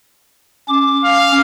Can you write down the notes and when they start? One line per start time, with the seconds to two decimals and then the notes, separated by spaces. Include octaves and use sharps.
0.69 C#4 D6
1.04 F5